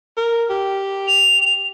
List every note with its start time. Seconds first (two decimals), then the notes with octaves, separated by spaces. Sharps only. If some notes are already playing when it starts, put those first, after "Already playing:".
0.17 A#4
0.50 G4
1.08 F7